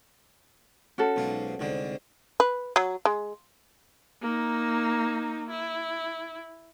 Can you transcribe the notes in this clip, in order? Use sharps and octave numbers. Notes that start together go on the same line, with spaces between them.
C#4 F#4 A4
B1 G#2 F4
C2 G#2 D3
B4
F#3
G#3
A#3 D#4
E4